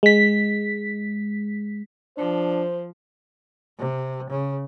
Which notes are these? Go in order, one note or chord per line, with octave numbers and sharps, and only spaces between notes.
G#3 B6
F3 D4 C5
C3
C#3